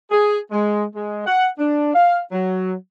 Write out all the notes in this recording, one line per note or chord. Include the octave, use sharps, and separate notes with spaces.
G#4
G#3
G#3
F#5
D4
F5
F#3